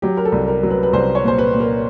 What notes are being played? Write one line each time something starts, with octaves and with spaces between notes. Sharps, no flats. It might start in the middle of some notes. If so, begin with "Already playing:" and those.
F#3 G4
A#4
A4
C2
A#4
F#3
B4
B4
C2 C5
C#5
A#2 C5
B4
A#2
A#4